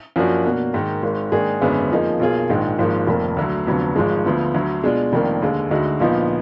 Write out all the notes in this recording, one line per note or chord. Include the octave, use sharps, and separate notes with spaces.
F#2 F3 A#3 D4 F#4
B2 A#3 D4 F#4
G#2 D#3 A#3
G#1 G#2 D#3
G#2 D#3 A#3 D4 G#4
G#1 F#2 D3 G#3 B3
F2 F3 A#3 D#4 G#4
B1 B2 A#3 F4 G#4
A#1 G#2 D#3 G#3
G#1 G#2 F3 A#3
F1 F2 D#3 A#3
D2 D3 F#3
F1 F2 D3 F#3 B3
G#1 G#2 F3 G#3
D2 D3 F3 B3
D2 D3 F#3
B2 G#3 D4 F4
F1 F2 D#3 A#3 D4
D#2 D3 G#3
D2 D3 G#3 D#4 F#4
A#1 A#2 F3 B3 D#4